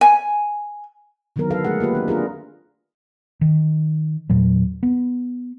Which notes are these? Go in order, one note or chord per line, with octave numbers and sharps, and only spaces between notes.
G#5
D3 D#3 F#3 B3 A#4
A4 B4 F5
G#3 A3 G#4 F#5
A#3 F4 G4 B4
C4 D4
D4 F4 G#4 A#4
D#3
E2 A#2 F#3
B3